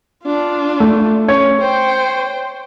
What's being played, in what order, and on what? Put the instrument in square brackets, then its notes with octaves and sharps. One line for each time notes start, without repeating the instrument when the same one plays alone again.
[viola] D4 F4
[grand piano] A3
[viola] C#4 [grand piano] C#5
[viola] C5 G5